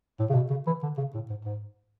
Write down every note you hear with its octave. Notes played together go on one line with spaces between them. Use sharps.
A2
C#3
B2
C#3
E3
D3
C#3
A2
G#2
G#2